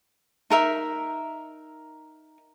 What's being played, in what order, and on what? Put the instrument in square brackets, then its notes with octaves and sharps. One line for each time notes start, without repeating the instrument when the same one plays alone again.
[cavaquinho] D#4 A#4 E5